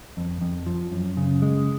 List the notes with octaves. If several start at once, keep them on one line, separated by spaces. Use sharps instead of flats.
F2
F2
F3
F#2
C#3
G#3